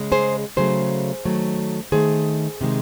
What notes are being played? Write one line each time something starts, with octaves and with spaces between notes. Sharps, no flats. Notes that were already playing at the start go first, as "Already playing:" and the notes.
Already playing: C#3 G#3
G#4 C5
C#3 F#3 A3 G#4 C5
D#3 F#3 A3
D#3 A3 G#4 C5
C3 D#3 G#3